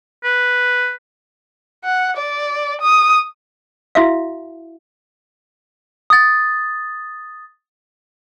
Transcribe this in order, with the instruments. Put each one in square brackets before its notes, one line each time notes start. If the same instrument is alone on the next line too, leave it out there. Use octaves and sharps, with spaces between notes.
[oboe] B4
[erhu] F#5
D5
D#6
[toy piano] E4 F#4 E5 F5
[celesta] D#6 A6